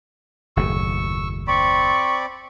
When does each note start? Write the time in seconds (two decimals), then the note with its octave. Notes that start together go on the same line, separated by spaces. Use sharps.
0.57 F#1 D#2 A2 C#6 E6
1.48 C4 D5 B5 C#6